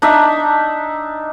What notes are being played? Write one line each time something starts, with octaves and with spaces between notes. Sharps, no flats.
D4 D#4 E5